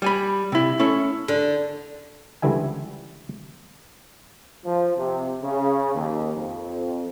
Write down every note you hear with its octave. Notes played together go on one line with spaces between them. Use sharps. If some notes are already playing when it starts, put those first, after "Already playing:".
G3 G#5 B5
C3 E4
A3 C#4 E4 A4
D3
C#2 D3 E3 G3 E5 G#5
F3
C3
C#3
D#2
F2